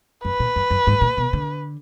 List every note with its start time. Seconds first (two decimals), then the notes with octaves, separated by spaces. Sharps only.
0.25 F#2 B4
0.40 A#2
0.56 F#2
0.71 F#2
0.87 G#2
1.01 A#2
1.17 B2
1.33 D3